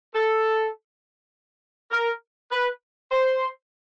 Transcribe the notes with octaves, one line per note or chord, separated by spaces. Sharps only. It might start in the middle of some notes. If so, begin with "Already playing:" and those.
A4
A#4
B4
C5